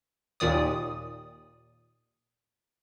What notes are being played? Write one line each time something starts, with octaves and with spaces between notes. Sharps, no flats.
D#2 A#2 D#3 D5 D#6